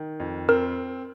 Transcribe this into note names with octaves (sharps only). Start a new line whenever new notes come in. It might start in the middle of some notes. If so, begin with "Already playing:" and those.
Already playing: D#3
F2
C4 A#4